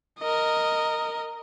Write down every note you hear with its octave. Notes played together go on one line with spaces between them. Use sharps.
A#4 D#5